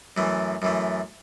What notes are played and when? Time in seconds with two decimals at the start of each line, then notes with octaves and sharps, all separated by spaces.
0.17 F#2 E3 A3
0.62 F#2 E3 A3